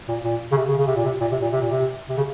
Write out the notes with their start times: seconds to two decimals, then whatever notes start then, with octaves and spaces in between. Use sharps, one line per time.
0.09 A#2
0.25 A#2
0.52 C#3
0.57 C3
0.68 C#3
0.78 C#3
0.87 C3
0.96 A#2
1.05 C3
1.21 A#2
1.31 C3
1.42 A#2
1.52 C3
1.62 A#2
1.72 C3
2.09 C3
2.17 C#3